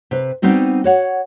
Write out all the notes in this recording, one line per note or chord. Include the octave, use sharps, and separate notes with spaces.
C3 B4
G3 B3 C4 D#4 F#4
F#4 C#5 F#5